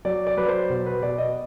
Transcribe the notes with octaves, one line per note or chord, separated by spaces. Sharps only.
F#3 D5
D5
F#3 B4
C5
B2
B4
B2 D5
D#5